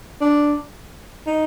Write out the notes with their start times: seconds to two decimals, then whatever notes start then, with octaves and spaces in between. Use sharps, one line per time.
0.21 D4
1.26 D#4